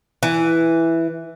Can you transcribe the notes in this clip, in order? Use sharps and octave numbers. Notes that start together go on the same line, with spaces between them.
E3